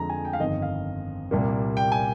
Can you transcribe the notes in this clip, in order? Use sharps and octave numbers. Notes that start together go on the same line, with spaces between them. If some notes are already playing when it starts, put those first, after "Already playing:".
Already playing: F2 D3 F3 G#3 A#5
G#5
G5
F5
G1 F2 D#3 D#5
F5
C2 A#2 G3 A#3
G5
G#5